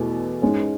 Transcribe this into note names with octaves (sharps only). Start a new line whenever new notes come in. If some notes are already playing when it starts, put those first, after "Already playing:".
Already playing: E2 B2 A3
G#2 G#3 C#4